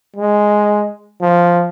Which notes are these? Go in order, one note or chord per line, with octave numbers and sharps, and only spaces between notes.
G#3
F3